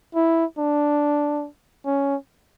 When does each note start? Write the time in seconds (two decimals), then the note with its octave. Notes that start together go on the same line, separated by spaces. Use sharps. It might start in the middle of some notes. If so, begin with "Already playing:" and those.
0.15 E4
0.58 D4
1.86 C#4